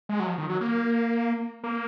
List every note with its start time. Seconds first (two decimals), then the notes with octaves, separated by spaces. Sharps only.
0.09 G#3
0.20 F#3
0.27 F3
0.38 D#3
0.49 F#3
0.61 A#3
1.64 A#3